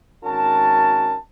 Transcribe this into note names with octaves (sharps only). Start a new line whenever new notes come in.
G#1 C#4 F#4 A#4 A5